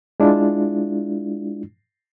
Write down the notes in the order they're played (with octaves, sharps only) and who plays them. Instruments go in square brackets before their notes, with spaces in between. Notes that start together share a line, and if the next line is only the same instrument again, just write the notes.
[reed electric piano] G#3 D4 E4 F4